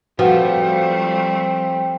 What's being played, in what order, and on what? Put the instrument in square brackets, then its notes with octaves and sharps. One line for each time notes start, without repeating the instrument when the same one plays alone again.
[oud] F3 [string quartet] G3 A3 [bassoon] C4 [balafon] F#4 B4 F#5